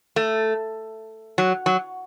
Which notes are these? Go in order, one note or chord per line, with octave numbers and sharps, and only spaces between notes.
A3
F#3
F#3